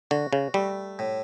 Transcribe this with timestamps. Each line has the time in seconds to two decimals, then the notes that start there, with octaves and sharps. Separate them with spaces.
0.11 D3 F#4
0.33 C#3
0.54 G3 A3
0.99 A2